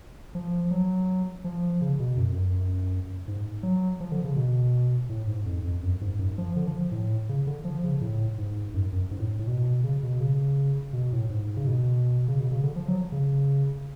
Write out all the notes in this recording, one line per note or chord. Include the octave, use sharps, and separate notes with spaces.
F3
F#3
F3
C#3
B2
F#2
F2
F#2
G#2
F#3
F3
D3
C#3
B2
A2
G#2
F2
F2
F#2
G#2
F#2
F3
D3
F3
A2
C#3
D3
F3
C#3
A2
G#2
F#2
F#2
G#2
A2
A2
B2
C#3
B2
C#3
B2
A2
G#2
C#3
B2
C#3
B2
C#3
D3
F3
F#3
C#3